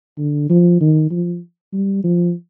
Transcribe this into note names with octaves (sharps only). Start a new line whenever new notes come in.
D3
F3
D#3
F3
G3
F3